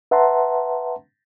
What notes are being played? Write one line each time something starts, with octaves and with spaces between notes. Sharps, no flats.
B4 E5 F#5 A5 A#5 C6